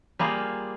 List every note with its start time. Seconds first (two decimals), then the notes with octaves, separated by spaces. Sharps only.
0.19 G3 A#3 F4 G#4